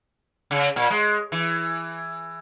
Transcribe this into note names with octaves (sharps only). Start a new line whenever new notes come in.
C#3
A#2
G#3
E3